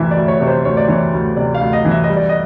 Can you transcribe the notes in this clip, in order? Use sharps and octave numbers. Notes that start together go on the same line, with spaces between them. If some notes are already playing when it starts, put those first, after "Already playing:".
Already playing: D2 C3 E3 E5
D5
D2
C#5
C3 C#5
C5
D2 C#5
D5
E3 C#5
D2
C3 D5
F5
D2
D#5
E3
E5
D#5
G3
D5
D#5